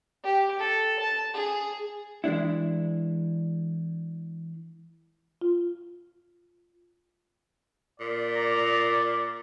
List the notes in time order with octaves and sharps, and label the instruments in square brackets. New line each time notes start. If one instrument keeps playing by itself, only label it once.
[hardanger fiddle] G4
A4
A5
G#4
[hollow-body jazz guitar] E3 G#3 D4 E4
[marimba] F4
[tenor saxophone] A#2 [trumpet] D5
[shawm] A#5